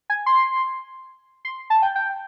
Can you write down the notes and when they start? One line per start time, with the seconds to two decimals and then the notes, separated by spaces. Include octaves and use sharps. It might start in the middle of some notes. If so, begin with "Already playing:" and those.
0.10 G#5
0.26 C6
1.45 C6
1.70 A5
1.82 G5
1.95 G5